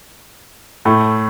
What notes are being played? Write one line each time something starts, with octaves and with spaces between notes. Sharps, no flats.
A2 A3